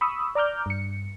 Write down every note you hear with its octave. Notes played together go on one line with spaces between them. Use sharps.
B5 C#6 D#6 E6
D5 A#5 D6 F6 G6
G2 C#7